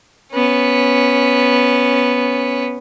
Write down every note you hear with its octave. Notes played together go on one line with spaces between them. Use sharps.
B3 C#4